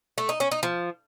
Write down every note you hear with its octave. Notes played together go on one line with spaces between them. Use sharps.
A3
D#4
C#4
D#4
F3